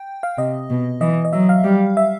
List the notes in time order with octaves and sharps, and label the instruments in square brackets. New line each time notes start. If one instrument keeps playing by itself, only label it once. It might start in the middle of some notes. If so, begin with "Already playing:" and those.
Already playing: [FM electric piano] G5
F5
[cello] C3 [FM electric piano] D#5
[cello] B2
[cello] E3 [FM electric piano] D#5
[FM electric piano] D#5
[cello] F#3 [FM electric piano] E5
[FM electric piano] F5
[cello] G3
[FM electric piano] E5